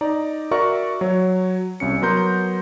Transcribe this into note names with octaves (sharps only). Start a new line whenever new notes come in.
D#4 D5 A#5
F#4 A#4 D5 E5 A#5 C#6
F#3 C#5
C2 C#4 C#7
F#3 B3 A#4 A#5 C6 G6